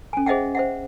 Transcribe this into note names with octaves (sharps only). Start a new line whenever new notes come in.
C#4 G#5
G#4 C5 D#5 E5 F#5 G5
C5 E5 F#5